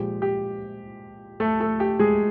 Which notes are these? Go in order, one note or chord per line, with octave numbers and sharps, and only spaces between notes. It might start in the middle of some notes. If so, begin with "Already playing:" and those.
Already playing: A#2 F3 G#3 G4
G4
A3 A4
A3 A4
G4
G#3 G#4